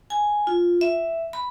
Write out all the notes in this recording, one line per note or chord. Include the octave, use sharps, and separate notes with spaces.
G#5
F4
E5
B5